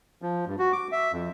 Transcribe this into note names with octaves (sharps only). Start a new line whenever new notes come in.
F3
G2
F#4
D6
E5
F2